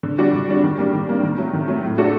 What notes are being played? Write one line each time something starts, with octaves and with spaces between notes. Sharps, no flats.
D3
G3 D4 F#4
D3
G3 D4 F#4
D#3
G3 A#3 D4
D#3
G3 A#3 D4
D#3
F#3 A3
D#3
F#3 A3
A2
A3 D4 F#4 A4